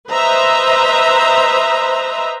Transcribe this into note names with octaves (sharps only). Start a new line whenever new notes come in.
B4 C5 D#5 E5 A#5